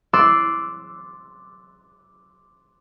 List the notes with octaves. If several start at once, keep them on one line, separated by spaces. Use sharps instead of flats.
C6 D6 E6 F#6 A6 D7